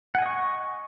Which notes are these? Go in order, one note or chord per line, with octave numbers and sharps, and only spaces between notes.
D#5 F#5 G#5 C#6